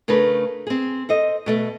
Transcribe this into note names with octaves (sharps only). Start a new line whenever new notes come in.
C#3 A3 D4 A#4 B4
C4 G#4
A4 C5 D#5
B2 A3 A4